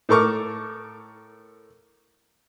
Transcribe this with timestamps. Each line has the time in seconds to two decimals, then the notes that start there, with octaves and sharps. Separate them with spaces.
0.09 A2 A4 A#4 C#6 D6